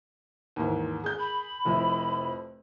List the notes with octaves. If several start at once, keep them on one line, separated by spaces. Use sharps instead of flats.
D#2 G#2 E3
G#4 G6
B5
F1 F2 E4